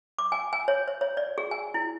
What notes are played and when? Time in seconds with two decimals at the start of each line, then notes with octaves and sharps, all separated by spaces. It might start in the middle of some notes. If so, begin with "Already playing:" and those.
0.19 D6
0.32 G#5
0.53 G#5
0.68 C#5
0.88 C#5
1.01 C#5
1.17 D5
1.38 G#4
1.51 G#5
1.74 E4